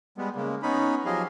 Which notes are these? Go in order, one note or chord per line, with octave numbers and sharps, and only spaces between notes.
G3 G#3 B3
C#3 G#3 A#3
B3 C#4 D#4 B5
F3 F#3 G4 G#4 D#5 F5